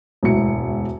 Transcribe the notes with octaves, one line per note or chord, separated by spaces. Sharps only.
E1 D2 G#2 B2 E4 C#7